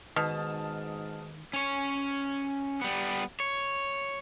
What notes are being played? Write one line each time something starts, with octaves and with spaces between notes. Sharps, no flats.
G#2 B2 D#3 A5 D#6 F6
C#4 C#5
G3 B3
C#5